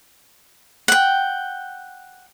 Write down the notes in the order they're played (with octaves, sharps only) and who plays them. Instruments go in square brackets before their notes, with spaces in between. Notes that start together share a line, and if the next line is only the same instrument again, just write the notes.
[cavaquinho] F#5 G5